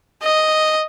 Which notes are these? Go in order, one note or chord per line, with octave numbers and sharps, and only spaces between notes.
D#5